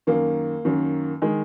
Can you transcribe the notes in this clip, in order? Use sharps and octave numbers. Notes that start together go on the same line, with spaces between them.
F#2 D#3 A#3
F#2 D#3
D#3 G#3